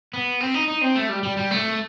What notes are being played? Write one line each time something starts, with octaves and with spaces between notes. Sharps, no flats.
B3
C4
D#4
D#4
C4
A3
G3
G3
G3
A3